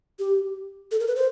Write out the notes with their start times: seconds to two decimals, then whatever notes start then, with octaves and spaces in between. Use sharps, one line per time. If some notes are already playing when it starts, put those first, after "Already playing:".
0.19 G4
0.92 A4
1.00 A#4
1.07 B4
1.16 C5